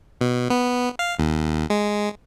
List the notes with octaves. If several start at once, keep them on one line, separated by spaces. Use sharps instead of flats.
B2
B3
F5
D#2
G#3